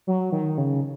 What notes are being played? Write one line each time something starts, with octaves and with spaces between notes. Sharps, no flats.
F#3
D#3
C#3